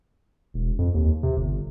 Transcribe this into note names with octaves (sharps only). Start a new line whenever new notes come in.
E1
F2
D#2
C3
G1